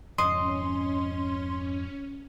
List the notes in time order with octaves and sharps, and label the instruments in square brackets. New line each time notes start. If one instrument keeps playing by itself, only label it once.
[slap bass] F2 G#2 C#3 [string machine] C#4 [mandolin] D#5 [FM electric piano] C6